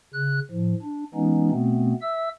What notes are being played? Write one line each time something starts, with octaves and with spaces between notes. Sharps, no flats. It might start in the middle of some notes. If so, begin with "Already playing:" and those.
C#3 F#6
A2 F3
D4
E3 G#3 B3 C#4 D#4
B2 A3 B3 C4
E5 E6